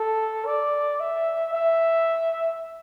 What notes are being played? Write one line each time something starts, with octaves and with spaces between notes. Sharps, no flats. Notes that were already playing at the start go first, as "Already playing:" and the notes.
Already playing: A4
D5
E5
E5